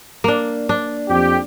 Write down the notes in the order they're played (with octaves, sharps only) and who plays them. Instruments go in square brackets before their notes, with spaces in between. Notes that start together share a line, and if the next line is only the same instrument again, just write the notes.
[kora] A#3 D4
D4
[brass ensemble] F2 G4